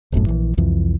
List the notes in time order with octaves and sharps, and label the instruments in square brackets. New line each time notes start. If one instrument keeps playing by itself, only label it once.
[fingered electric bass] D1 G1 F#2 A2
A#1 E3
C2 F2 E3